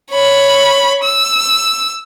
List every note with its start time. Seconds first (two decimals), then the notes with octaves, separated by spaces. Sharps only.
0.12 C#5 B5
1.04 E6